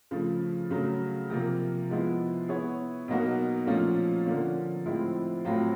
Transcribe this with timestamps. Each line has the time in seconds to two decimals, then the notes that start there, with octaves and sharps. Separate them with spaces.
0.11 C#3 F3 A3
0.70 C#3 F#3 A3
1.30 C3 F3 A#3
1.90 F3 G#3 B3 E4
2.48 B3 E4 G#4 C#5
3.08 B2 F#3 A#3 D#4 F#4
3.66 A#2 F3 A3 C#4 F4
4.26 D3 F3 A#3 C#4
4.86 A2 F3 G#3 C4 E4
5.45 A2 F#3 A3 C4 F4